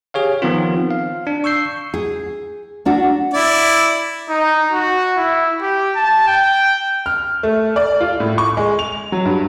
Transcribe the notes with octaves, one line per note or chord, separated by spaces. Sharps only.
G4 G#4 C#5 F5
D#3 F3 B3 C4 F4
F5
D4
C#6 E6 G6 C7
G#4
A#3 D4 F#4
E4 D5
D#4
F#4
E4
G4
A5
G5
F6
A3
D5
F4
A2
C#6
G#3
F7
F#3
G2